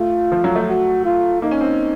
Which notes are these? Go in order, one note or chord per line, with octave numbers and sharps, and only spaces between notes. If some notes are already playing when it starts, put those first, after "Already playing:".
Already playing: A3 F4
F3
F#3
A3
F#4
F4
A#3 D#4
C#4
C4